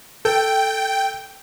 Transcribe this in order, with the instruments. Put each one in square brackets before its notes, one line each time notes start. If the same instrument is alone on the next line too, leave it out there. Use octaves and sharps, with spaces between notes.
[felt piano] A4 [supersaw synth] G5